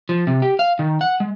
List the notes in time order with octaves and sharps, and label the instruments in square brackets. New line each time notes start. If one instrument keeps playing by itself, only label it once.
[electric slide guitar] F3
C3
G4
F5
D#3
F#5
G#3